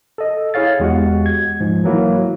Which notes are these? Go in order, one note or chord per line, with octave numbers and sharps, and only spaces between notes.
A4 D#5
E4 G#4 C#5 F5 A6
E2 G#3 F#4 G4 F#5
G#6
G#2 F3
E3 F#3 A#3 E4